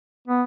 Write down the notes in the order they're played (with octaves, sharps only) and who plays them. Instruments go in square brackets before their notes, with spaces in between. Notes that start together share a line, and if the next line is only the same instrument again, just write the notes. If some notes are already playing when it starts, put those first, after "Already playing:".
[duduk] B3